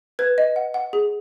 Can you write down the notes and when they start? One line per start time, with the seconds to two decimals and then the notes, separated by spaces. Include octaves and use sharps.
0.19 B4 G#6
0.38 D#5
0.56 F#5
0.74 F#5
0.93 G#4